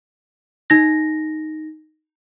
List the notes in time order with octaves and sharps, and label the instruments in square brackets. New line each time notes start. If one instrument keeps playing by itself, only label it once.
[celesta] D#4 A#6